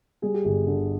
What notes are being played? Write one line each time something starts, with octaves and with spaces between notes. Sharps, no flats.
G3 G#4
G4
G1 G#4
D3